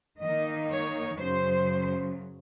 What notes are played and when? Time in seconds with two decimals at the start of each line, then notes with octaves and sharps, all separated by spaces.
0.22 D#3 A#3 D#4 D#5
0.71 C#5
1.20 F#2 C#3 F#3 C5